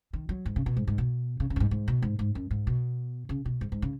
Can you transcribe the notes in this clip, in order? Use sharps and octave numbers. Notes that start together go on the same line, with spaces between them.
D#3
F#3
G#2
C#3
B2
G#2
G#2
B2
C#3
C#3
F#2
G#2
G#2
B2
G#2
G#2
F#2
G#2
B2
C#3
B2
G#2
G#2
C#3